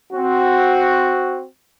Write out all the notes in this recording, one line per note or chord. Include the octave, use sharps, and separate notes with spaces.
C4 F#4